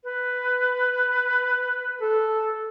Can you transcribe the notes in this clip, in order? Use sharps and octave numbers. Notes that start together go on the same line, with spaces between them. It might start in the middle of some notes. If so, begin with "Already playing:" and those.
B4
A4